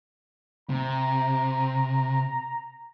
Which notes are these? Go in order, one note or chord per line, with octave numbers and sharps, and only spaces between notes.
C3 A#5